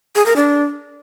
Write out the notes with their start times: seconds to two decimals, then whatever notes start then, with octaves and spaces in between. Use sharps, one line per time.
0.16 G#4
0.26 A#4
0.36 D4